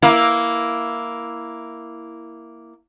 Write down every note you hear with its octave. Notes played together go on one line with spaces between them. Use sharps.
A#3 E4